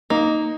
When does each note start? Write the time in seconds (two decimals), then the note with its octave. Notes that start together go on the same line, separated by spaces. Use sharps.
0.10 A#3 D#4